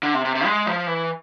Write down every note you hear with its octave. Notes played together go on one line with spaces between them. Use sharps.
D3
C3
C3
C3
G#3
F3
E3